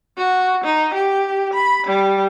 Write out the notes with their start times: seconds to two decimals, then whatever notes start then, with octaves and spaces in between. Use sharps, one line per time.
0.17 F#4
0.64 D#4
0.94 G4
1.54 B5
1.87 G3